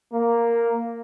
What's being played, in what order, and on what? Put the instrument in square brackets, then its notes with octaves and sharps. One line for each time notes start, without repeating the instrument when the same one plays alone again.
[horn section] A#3